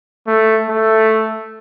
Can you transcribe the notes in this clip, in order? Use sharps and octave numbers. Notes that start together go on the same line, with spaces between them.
A3
A3